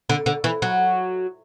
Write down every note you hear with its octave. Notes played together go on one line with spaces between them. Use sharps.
D3
D3
E3
F#3